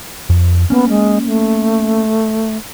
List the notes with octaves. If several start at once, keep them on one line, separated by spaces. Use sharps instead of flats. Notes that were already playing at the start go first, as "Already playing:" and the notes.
F2
A#3 B3 C#4
G#3
A3